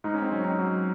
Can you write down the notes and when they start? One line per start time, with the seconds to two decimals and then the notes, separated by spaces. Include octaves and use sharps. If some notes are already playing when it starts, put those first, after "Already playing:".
0.04 G#2 D#4
0.14 C#4
0.22 C4
0.32 F#3 C#4
0.44 C4 D#4
0.59 F#3